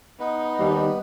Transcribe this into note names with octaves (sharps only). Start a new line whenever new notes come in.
B3 D#4 B4
D#2 G3